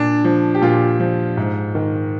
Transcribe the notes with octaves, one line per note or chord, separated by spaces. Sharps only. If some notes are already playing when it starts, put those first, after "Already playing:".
Already playing: A#2 D4
F3
G4
A#2 F4
F3
G#2
D#3